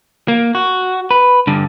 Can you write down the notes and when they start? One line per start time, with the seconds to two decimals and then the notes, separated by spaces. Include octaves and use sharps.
0.28 A#3
0.55 F#4
1.11 B4
1.47 G2 D3